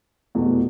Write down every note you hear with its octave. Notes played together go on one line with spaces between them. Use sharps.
F1 E2 B2